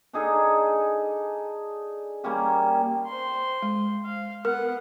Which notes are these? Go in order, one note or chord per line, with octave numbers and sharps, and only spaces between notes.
D4 D#4 G#4 A4
G3 A#3 C#4 G4
C5 C6
G#3
F5
B3 A#4 F#5